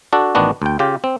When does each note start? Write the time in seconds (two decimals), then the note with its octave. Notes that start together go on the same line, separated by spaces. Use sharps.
0.13 D4 F#4 A4
0.35 A1 D#3 B3 D4 F#4
0.62 D2 G5
0.79 C#3 F4 G4
1.04 C4